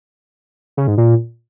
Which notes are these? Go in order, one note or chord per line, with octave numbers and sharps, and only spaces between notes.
C#3
G#2
A#2